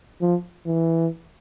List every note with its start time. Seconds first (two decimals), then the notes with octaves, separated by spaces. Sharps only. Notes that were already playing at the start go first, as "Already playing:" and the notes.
0.21 F3
0.66 E3